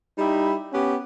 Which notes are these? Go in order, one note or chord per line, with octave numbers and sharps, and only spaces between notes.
G3 D#4 E4 G4
B3 C#4 G4